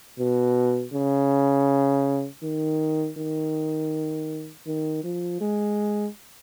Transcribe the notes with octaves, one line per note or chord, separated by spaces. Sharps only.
B2
C#3
D#3
D#3
D#3
F3
G#3